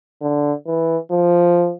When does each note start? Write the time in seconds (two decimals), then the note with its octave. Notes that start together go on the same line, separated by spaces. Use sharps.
0.22 D3
0.66 E3
1.11 F3